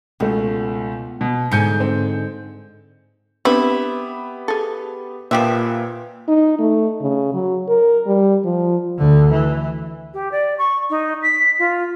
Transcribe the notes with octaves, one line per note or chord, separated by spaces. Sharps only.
C#2 B2 A3
B2
G#2 D3 G#5 G6 C#7
C4
B3 C4 D4 E4 G4 B4
G#4 A4
A#2 F3 A#3 G4 B4 E5
D#4
A3
C#3
F#3
A#4
G3
F3
D2 D3
E3
G4
D5
C#6
D#4
B6
F4